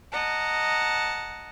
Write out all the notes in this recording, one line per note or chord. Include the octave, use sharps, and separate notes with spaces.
D#5 F#5 A5 A#5